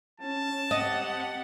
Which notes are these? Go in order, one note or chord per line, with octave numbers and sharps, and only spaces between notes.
C#4 A5
C4 G4 D#5 F#5